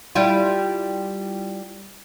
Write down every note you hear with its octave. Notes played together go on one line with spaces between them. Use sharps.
G3 E4 F4